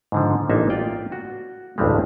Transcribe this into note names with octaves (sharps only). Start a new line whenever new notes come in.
G#2 D3 F3
A1 A#3 D4 D#4 E5
F4 D5 G5
F#4
A1 D2 G2 D3 G3 G#3